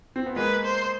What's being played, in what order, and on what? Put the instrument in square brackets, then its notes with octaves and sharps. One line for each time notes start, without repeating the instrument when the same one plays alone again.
[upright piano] C4
B3
[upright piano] G#3 A#3 [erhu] B4
[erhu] C5